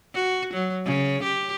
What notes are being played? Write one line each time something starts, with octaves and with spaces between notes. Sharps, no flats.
F#4
F#3
C#3
G4